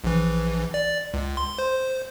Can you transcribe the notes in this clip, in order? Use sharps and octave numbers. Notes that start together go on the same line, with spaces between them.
A#1 E3
D5
C#2
C6
C5